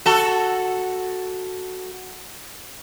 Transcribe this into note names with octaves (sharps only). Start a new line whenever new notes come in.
F#4 A4